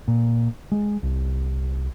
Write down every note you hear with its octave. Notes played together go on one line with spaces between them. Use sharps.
A#2
G#3
C2